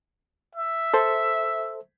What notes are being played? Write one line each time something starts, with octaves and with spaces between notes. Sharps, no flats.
E5
A4 C5